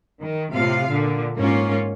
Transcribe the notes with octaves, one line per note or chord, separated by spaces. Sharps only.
D#3
A2 C3 F4 F5
A#2 D3
G#2 A#3 C#4 F4